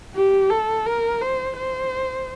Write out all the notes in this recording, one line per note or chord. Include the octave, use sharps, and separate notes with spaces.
G4
A4
A#4
C5
C5